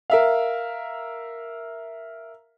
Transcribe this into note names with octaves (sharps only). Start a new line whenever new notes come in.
A#4 E5 F5